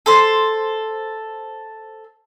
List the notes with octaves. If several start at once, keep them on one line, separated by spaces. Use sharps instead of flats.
A4 C5